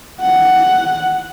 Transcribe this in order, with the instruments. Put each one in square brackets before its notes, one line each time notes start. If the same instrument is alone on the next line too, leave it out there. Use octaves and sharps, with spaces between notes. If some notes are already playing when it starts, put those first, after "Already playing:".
[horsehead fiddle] F#5